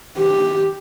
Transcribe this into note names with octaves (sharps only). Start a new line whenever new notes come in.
G4